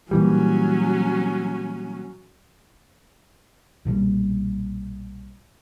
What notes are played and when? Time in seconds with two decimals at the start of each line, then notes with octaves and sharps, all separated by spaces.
0.11 A#2 E3 F#3 G3 C#4
3.85 B1 A#2 D3 G3